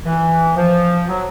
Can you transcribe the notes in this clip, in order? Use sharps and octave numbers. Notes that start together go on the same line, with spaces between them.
E3
F3
F#3